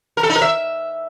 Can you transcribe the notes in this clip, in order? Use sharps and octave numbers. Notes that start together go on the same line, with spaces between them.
A#4
A4
D#4
A#4
E5